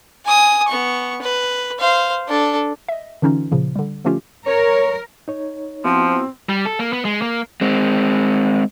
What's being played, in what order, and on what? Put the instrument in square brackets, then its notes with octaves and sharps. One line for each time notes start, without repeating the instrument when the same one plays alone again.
[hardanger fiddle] G#5 D#6
B3 C#6
B4
C5 F5
D4 A4
[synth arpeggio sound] D#5 E5
D3 E3 C#4 D#4 F4
A#2 C#3 F3
D3 G3
D3 F3 A3 C#4 F4 G4
[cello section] A#4 [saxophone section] C#5
[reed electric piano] D#4 C#5
[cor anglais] F3 [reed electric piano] B3 E4 F#4 [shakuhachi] C4
[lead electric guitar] G3
A4
A#3
B3
G#3
A#3
[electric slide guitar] G#3 C4